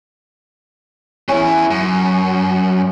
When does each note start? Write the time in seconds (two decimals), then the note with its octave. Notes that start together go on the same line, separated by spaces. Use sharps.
1.28 E2 C#4 E4
1.71 F#2